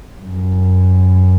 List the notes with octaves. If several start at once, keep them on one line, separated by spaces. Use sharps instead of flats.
F#2